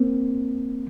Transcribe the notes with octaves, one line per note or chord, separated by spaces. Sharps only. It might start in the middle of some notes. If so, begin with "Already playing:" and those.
Already playing: A#3 C4